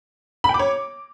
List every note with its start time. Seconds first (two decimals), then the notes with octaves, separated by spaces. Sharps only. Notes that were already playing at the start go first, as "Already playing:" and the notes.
0.44 B5
0.49 G5
0.54 D6
0.59 C#5